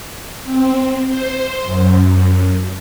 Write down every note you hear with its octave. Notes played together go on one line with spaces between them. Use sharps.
C4
C5
F#2